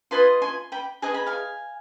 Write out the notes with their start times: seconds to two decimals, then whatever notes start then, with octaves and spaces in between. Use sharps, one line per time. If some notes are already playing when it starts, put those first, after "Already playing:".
0.11 F4 B4 D#5 G#5 C6
0.42 G#5 C6
0.72 G5 B5
1.02 G#4 B4 D#5 G#5
1.14 B5
1.26 F5 G#5